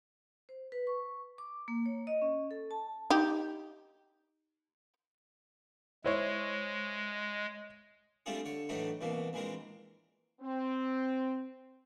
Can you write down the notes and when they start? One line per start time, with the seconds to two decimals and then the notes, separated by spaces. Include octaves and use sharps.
0.49 C5
0.72 B4
0.87 C#6
1.38 D6
1.68 A#3
1.86 C#5
2.07 D#5
2.22 C#4
2.51 A4
2.71 A5
3.10 D#4 G4
6.04 G#3 E4 C5 C#5
8.26 G3 A3 C4 D4 F4 G#4
8.45 D3 C#5
8.69 A2 E3 F#3 A3 D4 D#4
9.01 C2 B2 E3 A#3
9.33 A#1 E3 G#3 C4 A#4
10.41 C4